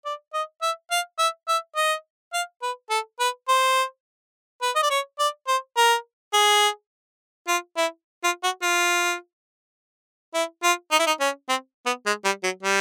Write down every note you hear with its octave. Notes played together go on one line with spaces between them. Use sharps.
D5
D#5
E5
F5
E5
E5
D#5
F5
B4
A4
B4
C5
B4
D#5
D5
C#5
D5
C5
A#4
G#4
F4
E4
F4
F#4
F4
E4
F4
D#4
E4
D#4
C#4
C4
B3
G#3
G3
F#3
G3